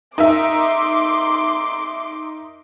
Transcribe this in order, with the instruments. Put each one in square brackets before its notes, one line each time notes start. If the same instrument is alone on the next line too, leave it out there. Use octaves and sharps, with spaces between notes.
[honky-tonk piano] D#4 A#4 E5 [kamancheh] C6 D6